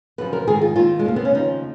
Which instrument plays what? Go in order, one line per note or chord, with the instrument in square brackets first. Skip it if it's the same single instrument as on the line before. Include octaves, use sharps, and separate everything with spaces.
[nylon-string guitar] F#2 C#3 F3 B4
A#4
G#2 D#3 G#4
F4
D#2 D#3 F4
G#3
F2 C#3 F3 A#3
B3
C#4
D#2 C#3 F3 D#4